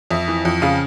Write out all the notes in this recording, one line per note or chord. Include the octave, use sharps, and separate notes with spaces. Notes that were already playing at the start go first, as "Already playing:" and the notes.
F2 E5
E3
F2
C#3 F5